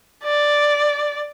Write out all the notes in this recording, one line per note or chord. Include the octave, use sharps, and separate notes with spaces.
D5